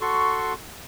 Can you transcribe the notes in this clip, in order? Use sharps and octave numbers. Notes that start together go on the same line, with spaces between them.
F#4 A4 C6 C#6